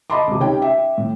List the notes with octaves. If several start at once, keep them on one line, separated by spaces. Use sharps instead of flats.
D#5 A5 B5 C6 D6
C#2 C3
C#4 D#4 G4 G5
E5 G5
A2